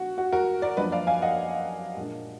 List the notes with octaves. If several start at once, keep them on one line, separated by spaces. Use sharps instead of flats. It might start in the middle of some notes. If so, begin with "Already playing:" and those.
Already playing: D3 G#3 B3 F#4
F#4
F#4 A#4
A#4 D5
F#2 F3 A#3 D4 B4 D#5
D5 F5
F5 G#5
D#5 F#5
A#2 G#3 D4